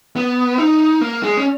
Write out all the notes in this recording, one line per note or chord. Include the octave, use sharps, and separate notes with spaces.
B3
D#4
A#3
G#3
C#4